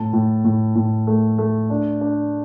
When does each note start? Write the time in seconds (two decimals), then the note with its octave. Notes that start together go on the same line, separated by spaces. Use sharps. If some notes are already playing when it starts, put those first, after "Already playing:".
Already playing: A2 A5
0.13 A2
0.45 A2
0.76 A2
1.07 A3
1.38 A3
1.70 D4
2.01 D4